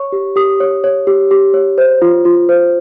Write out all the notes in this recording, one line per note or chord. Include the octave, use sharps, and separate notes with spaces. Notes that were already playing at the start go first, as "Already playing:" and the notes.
Already playing: C#5 C#6
G4
G4 D#6
C#5
C#5
G4
G4
C#5
C5
F4
F4
C5